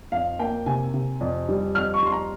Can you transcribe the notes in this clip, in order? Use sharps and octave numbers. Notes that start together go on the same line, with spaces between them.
F2 F5
A#3 G5
C3 G#5
C3
F2
G3
F2 F6
C#6
G3 C6
A#5